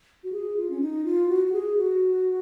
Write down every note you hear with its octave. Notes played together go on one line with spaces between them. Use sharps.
F#4
G#4
F4
C#4
D#4
F4
F#4
F#4
G#4
F#4